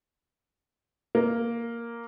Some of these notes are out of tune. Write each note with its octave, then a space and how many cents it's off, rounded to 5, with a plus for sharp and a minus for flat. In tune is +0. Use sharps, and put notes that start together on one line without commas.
A#3 +0